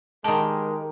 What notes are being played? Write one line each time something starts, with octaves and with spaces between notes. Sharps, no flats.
D#3 G#3 G4 A#4 A5